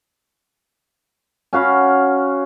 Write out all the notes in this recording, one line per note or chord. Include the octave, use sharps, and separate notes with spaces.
C#4 F#4 F5 B5